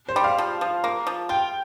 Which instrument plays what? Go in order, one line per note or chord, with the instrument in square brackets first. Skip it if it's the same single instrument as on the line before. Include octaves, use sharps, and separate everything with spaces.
[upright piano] C5
[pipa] G3
[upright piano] F5
[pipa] F3
F3
A#3
F3
[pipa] F4 [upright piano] G5